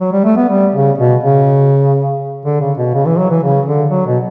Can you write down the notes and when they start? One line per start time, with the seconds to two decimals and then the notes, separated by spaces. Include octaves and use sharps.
0.01 F#3
0.12 G3
0.24 A3
0.37 B3
0.49 G3
0.74 C#3
0.98 B2
1.23 C#3
2.45 D3
2.60 C#3
2.78 B2
2.94 C#3
3.06 E3
3.18 F#3
3.30 E3
3.43 C#3
3.66 D3
3.91 F#3
4.07 B2